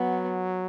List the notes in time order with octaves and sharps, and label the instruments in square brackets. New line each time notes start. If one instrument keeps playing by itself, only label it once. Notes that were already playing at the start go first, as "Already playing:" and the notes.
Already playing: [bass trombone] F#3 [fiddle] B3